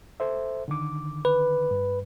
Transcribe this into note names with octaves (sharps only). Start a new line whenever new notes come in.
A4 C5 E5
D3 D#3 D6
B4
G2